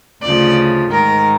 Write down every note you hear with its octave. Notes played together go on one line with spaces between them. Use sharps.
D2 C#3 F3 D5
G#2 D#3 A#4